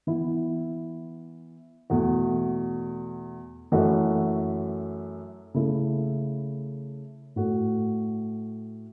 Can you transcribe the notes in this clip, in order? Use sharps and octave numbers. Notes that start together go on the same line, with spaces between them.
E3 B3 E4
E2 B2 A3 F#4
F#2 E3 A3 F#4
C#3 A3 E4
A2 A3 F#4